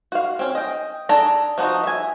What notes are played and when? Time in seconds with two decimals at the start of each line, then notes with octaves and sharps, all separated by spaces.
0.12 F#4 F5
0.39 C4 C#4
0.55 D#5 G5
1.09 D4 G#4 A4 A5 A#5
1.58 F3 B3 D4 D#4 F#4
1.84 E5 G#5